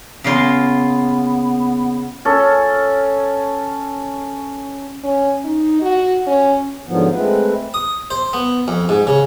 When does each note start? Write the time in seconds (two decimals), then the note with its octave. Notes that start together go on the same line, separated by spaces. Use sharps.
0.24 C#3 A#3 B3 F4
2.25 C#4 A4
5.03 C#4
5.44 D#4
5.82 F#4
6.27 C#4
6.87 G#2 D3 F3 F#3 B3
7.13 G#3 A3 C4 B4
7.74 D#6
8.11 C5
8.33 B3
8.68 F2
8.89 G#2
9.07 C#3